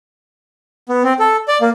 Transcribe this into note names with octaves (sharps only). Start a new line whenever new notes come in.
B3
C4
A4
D5
A#3